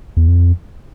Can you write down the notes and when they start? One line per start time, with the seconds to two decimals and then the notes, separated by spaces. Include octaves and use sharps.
0.17 E2
0.28 F2